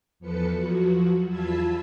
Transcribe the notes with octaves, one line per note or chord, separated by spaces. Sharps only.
E2 F3 A4 B4 C#7
F3 F#3 F#4
E2 F4 A5 B5 E6 G#6